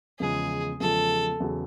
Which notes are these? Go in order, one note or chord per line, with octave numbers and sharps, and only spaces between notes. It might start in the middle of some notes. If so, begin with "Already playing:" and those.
E2 C#3 F3 G#3 G#4
E2 C#3 F3 G#3 A4
E2 C#3 F#3